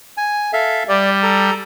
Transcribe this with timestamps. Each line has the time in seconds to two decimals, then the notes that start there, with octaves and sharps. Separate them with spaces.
0.17 G#5
0.53 A4 E5 F5
0.88 G3 D5
1.23 A4 A#5